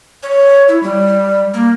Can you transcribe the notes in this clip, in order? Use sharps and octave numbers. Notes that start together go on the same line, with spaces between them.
C#5
E4
G3
A#3